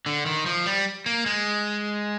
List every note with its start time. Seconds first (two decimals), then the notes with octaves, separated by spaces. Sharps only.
0.06 D3
0.26 D#3
0.46 F3
0.66 G3
1.06 A#3
1.26 G#3